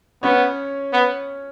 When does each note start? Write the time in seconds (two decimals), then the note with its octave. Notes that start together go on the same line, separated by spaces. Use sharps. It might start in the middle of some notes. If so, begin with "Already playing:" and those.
0.23 B3 C#4 C#5
0.93 B3